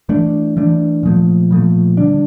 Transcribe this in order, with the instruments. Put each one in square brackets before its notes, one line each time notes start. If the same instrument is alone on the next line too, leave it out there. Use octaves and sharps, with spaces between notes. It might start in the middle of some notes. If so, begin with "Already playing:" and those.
[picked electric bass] E3 A3 D4
E3 A3 D4
A#2 F3 A3
A#2 F3 A3
D3 G3 D4